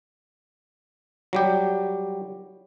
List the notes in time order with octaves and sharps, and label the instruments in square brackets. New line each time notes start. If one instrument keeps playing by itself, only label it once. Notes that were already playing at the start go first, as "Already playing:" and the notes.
[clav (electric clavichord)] F#3 G3 G4